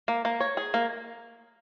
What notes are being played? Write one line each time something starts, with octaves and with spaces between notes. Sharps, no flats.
A#3
A#3
C#5
G#4
A#3